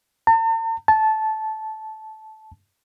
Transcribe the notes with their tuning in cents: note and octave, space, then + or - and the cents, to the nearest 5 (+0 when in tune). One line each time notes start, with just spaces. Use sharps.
A5 +45
A5 -15